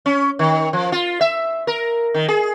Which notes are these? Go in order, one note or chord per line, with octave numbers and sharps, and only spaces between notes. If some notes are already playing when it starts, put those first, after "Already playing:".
C#4
D#3
F3
F4
E5
A#4
D#3
G#4